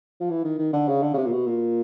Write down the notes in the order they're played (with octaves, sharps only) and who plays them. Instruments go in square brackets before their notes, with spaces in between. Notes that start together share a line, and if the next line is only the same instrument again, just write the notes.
[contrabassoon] F3
E3
D#3
D#3
D3
C#3
D3
C#3
C3
A#2
B2
A#2